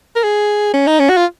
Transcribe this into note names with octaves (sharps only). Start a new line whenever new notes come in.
A#4
G#4
C#4
D#4
C#4
F#4
F4